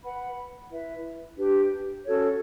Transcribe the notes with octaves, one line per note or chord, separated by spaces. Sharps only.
B4 F#5 B5
E4 B4 E5
D4 G4 B4
C#4 F#4 A4 C#5